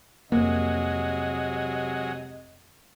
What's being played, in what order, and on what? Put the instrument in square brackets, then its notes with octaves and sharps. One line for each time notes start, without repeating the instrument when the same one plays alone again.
[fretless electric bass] F2 A#3 [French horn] C3 [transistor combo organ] F#3 G#3 [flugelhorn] D#5